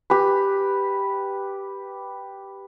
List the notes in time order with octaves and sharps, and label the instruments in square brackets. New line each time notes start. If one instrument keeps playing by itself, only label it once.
[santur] G4 B4